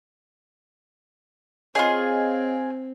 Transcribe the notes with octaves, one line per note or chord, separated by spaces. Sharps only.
C4 F4 G#4 C#5 D#5 F5